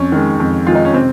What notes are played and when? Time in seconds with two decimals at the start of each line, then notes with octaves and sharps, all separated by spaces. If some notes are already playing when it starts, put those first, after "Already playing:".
Already playing: F2 C#4
0.12 D#3 G#3
0.40 F2
0.66 D#3 G#3 F4
0.75 D#4
0.85 C#4
0.93 C3 C4